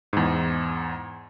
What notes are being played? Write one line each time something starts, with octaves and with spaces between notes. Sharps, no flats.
E2 G#2